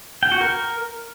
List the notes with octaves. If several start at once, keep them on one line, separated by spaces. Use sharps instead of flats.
G5
F#4
A#4